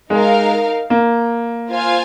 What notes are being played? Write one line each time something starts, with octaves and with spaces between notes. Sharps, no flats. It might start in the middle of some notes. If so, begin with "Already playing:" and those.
G#3 D#4 A#4 F5
A#3
F4 C5 F5 G#5